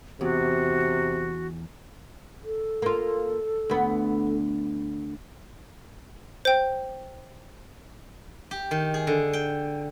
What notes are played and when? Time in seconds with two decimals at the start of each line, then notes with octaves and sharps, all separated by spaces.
0.21 E2 C3 F#4
2.44 A4
2.82 A#3 F4
3.70 D2 B3
6.45 C5 G5
8.51 G4
8.71 D#3
8.94 G#4
9.07 D3
9.33 G5